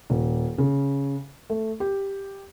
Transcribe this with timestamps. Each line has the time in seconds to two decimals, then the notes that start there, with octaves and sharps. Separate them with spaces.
0.10 D#1
0.58 C#3
1.50 A3
1.80 G4